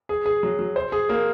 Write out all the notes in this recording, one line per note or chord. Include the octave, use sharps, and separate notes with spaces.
G#4
G#4
F#3
F#3
C5
G#4
A#3